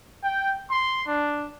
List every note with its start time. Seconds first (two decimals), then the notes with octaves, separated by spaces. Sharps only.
0.23 G5
0.69 C6
1.07 D4